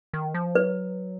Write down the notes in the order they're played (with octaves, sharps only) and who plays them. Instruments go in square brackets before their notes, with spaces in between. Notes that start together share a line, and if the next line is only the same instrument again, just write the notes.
[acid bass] D#3
F3
[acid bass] F#3 [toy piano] B4